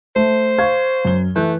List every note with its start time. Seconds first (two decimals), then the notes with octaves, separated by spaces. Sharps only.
0.16 A3 C5
0.58 F5 C#6 G#6
1.05 F#2 G7
1.36 E3 A3 F#6 G6